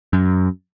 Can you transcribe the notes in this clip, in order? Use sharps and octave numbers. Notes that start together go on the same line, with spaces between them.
F#2